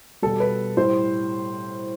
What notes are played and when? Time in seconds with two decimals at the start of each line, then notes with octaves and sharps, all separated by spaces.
0.22 B2 G3 A4
0.40 B4
0.77 A2 G3 C5